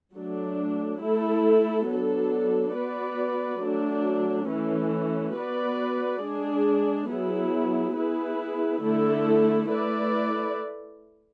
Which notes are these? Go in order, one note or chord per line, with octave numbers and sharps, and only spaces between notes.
F#3 A3 D4
A3 E4 A4
F#3 B3 D4 A4
B3 F#4 B4 D5
F#3 A3 D4
E3 A3 C#4
B3 F#4 B4 D5
G#3 D4 G#4
F#3 B3 E4 G#4
B3 E4 G#4 B4
D3 A3 E4 A4
A3 E4 B4 D5